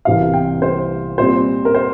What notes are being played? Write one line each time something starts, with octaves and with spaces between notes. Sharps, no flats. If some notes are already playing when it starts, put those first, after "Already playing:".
C2 C3 E3 G3 D4 F5
G5
C5
A#2 G3 C4 C5
A#4
C5